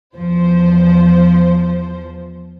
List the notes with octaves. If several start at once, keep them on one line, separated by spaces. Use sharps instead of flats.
E2 F3 C5